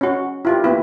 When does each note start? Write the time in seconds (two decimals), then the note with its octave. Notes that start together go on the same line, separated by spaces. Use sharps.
0.01 C#4 F#4
0.45 E4 F4 G4
0.64 A#3 B3 E4